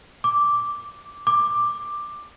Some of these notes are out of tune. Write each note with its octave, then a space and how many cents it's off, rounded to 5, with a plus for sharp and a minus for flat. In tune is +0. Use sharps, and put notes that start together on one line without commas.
D6 -5
D6 +10